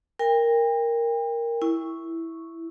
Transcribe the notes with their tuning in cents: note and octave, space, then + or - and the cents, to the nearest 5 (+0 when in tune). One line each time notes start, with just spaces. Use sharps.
A#4 +0 G5 +35
E4 +0 C#6 +0